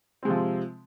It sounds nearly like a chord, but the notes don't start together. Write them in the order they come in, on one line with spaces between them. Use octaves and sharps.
C4 G#3 C3 F3